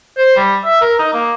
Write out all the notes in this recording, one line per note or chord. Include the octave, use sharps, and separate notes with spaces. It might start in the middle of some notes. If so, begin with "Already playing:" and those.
C5
G3
E5
A#4
D#4
A#3